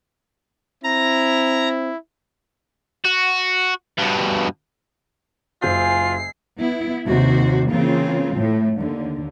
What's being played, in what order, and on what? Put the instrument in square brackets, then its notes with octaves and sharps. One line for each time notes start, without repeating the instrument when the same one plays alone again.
[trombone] C4 [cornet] E4 [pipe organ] A#5
[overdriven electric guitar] F#4
G2 B2
[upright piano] F#1 C5 G6 [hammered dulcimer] G#3 E4 G#4 [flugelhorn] F4 [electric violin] C7
[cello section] B3 E4
D#2 C3 F#4 C5
C#3 E3 A#3 C4 F4
A2 A3
D#2 D3